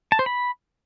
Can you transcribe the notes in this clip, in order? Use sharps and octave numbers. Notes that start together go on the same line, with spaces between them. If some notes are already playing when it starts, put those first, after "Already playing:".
A5
C5
B5